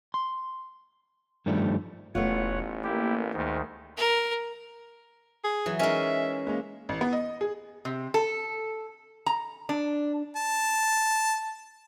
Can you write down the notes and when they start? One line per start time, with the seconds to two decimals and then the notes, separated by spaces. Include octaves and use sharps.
0.14 C6
1.46 G2 D#3 F3 G3 A3
2.15 E1 A1 A3 B3 F4 C#5 F#5
2.84 A#3 E4 G4
3.34 D2 G#2 D#3
3.97 A#4
5.44 G#4
5.66 E3 F#3 F#4
5.79 G#3 C#4 D#4 G#4 A#4 E5
6.47 G#3 A#3 C#4
6.89 A1
7.01 B3
7.13 D#5
7.41 G#4
7.85 C3
8.14 A4
9.26 A#5
9.69 D4
10.36 A5